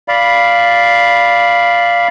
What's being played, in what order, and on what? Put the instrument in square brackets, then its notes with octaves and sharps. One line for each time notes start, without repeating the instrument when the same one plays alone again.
[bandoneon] D5 F5 B5